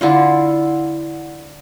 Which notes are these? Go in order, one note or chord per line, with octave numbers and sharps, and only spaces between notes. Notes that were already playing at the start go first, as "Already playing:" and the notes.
D3 E4 F4